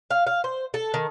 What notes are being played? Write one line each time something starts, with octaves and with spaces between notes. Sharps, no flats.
F5
F5
C5
A4
D#3